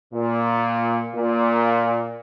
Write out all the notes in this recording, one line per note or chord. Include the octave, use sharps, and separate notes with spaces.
A#2
A#2